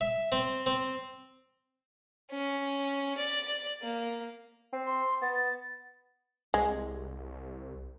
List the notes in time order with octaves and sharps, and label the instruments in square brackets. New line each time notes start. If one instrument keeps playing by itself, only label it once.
[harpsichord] E5
C4
C4
[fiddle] C#4
D5
A#3
[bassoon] C4
[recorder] C6
[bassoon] B3 [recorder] A6
[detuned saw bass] C2 [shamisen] G#3